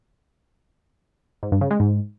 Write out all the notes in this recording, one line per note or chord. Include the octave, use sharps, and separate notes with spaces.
G#2
G2
C#3
G#3
G#2